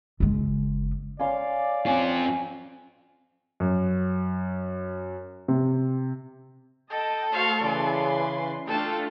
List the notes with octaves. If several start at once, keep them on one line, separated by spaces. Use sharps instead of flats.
F#1 G#3
C#4 D5 F5 C6
C4 C#4 F4
F#2
C3
A4 D#5 G5 A5
A3 F#4 C5 F5 C#6
C#3 E3 B4 D5 G#5 C6
A3 D4 F4 A4 G5 A5